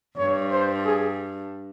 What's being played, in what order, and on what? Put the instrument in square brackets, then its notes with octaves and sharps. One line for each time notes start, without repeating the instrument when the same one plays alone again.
[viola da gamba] G2 [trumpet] C#5
[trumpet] C5
G#4